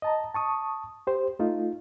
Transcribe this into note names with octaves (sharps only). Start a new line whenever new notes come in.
D#5 A5 A#5
A5 C#6 D#6
G4 C5
A3 D#4 F4